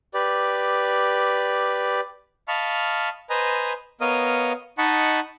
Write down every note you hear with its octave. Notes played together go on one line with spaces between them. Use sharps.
G4 B4 D5
D#5 F5 A5 B5 C#6 F6
B4 C5 D#5 G#5 A#5
B3 A#4 C#5 D#5 F5 D#6
D#4 D#5 F#5 A5 B5 C#6